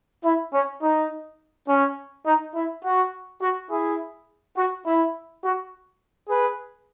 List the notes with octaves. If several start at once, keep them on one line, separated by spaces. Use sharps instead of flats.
E4
C#4
D#4
C#4
D#4
E4
F#4
F#4
E4 G#4
F#4
E4
F#4
G#4 B4